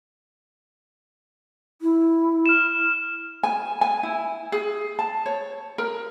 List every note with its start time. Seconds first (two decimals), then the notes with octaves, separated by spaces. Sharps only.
1.82 E4
2.46 F6 E7
3.43 G#5
3.81 G#5
4.03 E4
4.52 G#4
4.99 A5
5.26 C#5
5.78 A#4